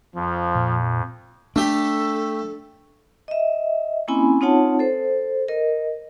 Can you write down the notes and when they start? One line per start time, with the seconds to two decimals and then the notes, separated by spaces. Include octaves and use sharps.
0.15 F2 F3
0.55 A#2
1.56 A3 D4 G4 A4
3.28 D#5 E5
4.08 A#3 C4 C#4 E4 G#5 B5
4.41 C4 D#4 F4 C#5 F#5 A5
4.79 A4 C5
5.48 A#4 D#5